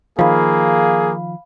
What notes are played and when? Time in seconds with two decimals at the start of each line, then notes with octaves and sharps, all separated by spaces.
0.19 D#3 F3 A#3 G#4 F5 B5